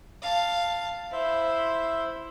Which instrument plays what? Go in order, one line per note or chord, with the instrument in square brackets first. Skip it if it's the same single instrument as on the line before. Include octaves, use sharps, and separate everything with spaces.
[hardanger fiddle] F5 A5
[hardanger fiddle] E4 [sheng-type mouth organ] C5 E5